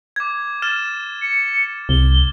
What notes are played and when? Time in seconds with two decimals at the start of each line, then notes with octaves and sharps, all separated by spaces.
0.16 D6 G#6
0.62 F6 A6 E7
1.21 C#7
1.89 C2 G7